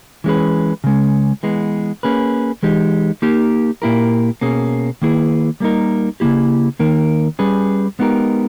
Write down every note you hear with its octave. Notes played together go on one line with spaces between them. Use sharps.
E3 G#3 C#4 G#4 B4
C#3 G#3 C#4
E3 G#3 B3
A#3 C#4 G#4 B4
E3 G#3 D#4 G4
A#3 D#4 G4 A#4
A#2 A#3 E4 G4 A#4
B2 A#3 C#4 G#4
D#3 A#3 E4 G#4 B4
G3 A#3 D#4 A#4
C#3 E3 A#3 E4 G4
D#3 A#3 D#4 A#4
G3 C#4 G#4 B4
G#3 B3 D#4 G4 A#4